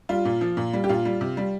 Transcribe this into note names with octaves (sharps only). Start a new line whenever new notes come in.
G3 F4
A#2
F3
A#2
G3
G4
A#2 F4
G3
C3
G3